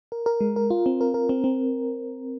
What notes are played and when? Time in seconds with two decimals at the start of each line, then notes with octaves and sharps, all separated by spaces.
0.12 A#4
0.26 A#4
0.41 G#3
0.56 A#4
0.70 F4
0.86 C4
1.01 A#4
1.14 A#4
1.29 C4
1.44 C4